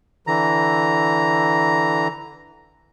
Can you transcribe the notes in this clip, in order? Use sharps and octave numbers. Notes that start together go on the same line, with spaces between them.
D3 E3 A#5